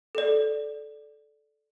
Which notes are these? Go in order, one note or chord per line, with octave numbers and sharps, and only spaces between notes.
A4 D5